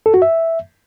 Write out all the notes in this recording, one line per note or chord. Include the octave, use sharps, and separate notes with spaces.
A4
F#4
E5